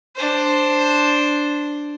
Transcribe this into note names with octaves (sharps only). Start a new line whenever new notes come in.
D4 C5